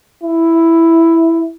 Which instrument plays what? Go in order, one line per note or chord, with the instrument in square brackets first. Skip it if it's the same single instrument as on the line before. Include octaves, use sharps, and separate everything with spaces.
[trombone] E4